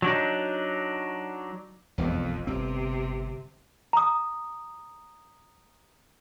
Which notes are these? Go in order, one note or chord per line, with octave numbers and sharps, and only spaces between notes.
F#3 D4 D#4
E1 B1 F2
G1 C3 C4
A#5 D#6